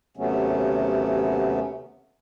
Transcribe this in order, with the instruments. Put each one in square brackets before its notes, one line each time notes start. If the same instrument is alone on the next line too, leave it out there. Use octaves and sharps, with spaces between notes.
[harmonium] D#2 C3 F#3 A3 B3 C#4